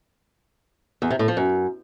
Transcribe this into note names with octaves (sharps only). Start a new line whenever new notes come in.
E2
C3
A2
F3
F#2